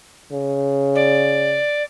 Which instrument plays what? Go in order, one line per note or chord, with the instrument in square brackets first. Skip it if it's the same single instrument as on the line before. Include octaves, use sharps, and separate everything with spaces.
[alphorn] C#3
[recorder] D5